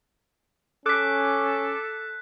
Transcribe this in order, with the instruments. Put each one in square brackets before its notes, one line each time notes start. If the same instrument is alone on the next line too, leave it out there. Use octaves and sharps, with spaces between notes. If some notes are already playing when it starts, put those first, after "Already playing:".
[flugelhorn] C#4 [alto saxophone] A4 [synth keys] D6 [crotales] F#6 B6